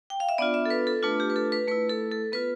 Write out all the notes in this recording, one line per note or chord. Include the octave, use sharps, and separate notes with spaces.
G5
F5
E5
B3 D4 F4 D5
E5
A4
B4
A4
A3 D4 F4 B4
G4
B4
A4
B4
A3 E4 B4
A4
A4
B3 F4 B4